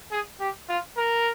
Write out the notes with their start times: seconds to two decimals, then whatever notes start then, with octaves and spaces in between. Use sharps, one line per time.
0.12 G#4
0.40 G4
0.69 F4
0.97 A#4